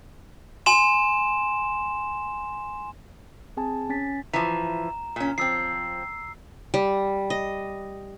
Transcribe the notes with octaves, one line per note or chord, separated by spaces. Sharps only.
G#5 C6 E7
C4 G#4 G#5 A5
C#4 G#5 A6 B6
E3 F3 A#5 E7
A#2 C#4
F3 C4 E6 C7
G3
D#5